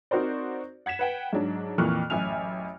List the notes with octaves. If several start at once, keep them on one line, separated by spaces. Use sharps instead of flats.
C4 D#4 F#4 A#4 C5 D5
F#5 G#6 B6 E7
B4 F#5 G5
G#2 F#3 D4
F2 A#2 E3 C#6 F6 F#6
A1 F#2 E5 G#5 F6 F7